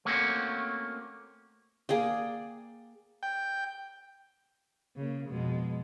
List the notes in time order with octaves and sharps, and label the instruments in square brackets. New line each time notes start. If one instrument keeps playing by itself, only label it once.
[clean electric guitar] A3 A#3 C4 C#4 F#4
[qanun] A#3 G#4 D5 G5
[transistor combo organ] G5
[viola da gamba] C#3 A#3
F2 B2 G#3